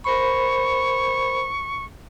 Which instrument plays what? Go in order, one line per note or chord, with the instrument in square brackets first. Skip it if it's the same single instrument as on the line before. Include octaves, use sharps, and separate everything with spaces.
[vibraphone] A#4 C5 B5 [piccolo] C#6